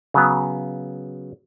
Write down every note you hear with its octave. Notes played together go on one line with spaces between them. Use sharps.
C#3 F#3 B3